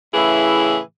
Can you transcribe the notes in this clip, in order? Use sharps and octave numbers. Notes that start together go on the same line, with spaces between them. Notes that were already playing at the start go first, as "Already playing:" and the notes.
A2 C#3 E3 E4 G#4